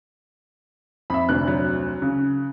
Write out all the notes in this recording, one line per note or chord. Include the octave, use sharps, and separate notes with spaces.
F2 E5 B5
F1 D2 F#6
F#3
C#3